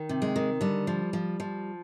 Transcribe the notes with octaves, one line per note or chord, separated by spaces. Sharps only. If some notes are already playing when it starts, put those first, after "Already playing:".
Already playing: D#3
C3
G#3
D#3
D3 G3
F3
F3
F3